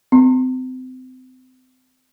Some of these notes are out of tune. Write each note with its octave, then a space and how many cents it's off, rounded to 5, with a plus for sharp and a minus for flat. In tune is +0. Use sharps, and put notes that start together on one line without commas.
C4 -30 C6 +35